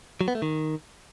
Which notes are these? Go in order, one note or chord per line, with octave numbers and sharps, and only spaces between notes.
F#3
B3
A3
D#3